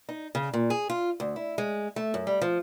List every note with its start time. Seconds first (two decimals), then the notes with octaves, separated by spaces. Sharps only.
0.09 D#4
0.35 C#3
0.54 A#2
0.70 G#4
0.90 F4
1.20 D2
1.36 E4
1.58 G#3
1.96 A3
2.14 F#2
2.27 G3
2.42 F3